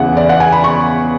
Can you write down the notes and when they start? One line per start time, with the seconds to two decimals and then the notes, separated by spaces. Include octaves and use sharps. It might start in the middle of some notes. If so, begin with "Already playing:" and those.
Already playing: E2 C#3 E3 F#5
0.17 D5
0.29 F#5
0.40 G#5
0.52 B5
0.64 C#6